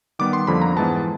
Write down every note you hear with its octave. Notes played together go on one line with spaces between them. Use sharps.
D#3 G3 B3 D6
C6
F2 D3 F3 A#3 B5
A#5
G#2 E3 G#3 B3 A5